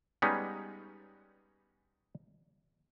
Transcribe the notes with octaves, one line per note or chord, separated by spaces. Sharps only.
G3 G#3 B3 C#4 D#4